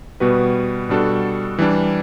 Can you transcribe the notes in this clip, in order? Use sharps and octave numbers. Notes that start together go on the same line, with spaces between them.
B2 G3 B3 F#4 B4
B2 G3 D4 F#4 A4
E3 G3 D4